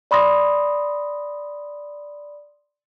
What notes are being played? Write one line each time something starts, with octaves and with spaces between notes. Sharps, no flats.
D5 B5 C6 D#6 A#6